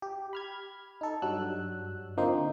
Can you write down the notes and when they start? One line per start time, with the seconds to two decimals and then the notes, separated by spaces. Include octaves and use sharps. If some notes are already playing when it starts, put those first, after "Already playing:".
0.02 G4
0.33 B5 F6 G#6
1.01 D#4 A4
1.22 G2 F#3 G3 F#4 E6 F#6
2.17 D3 F3 A#3 C4 D#4 C5